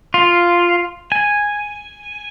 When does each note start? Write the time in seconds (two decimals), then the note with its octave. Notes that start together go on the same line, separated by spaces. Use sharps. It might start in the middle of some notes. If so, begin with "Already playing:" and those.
0.14 F4
1.12 G#5